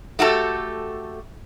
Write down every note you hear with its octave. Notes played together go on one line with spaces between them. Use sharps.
A3 F#4 G4 A4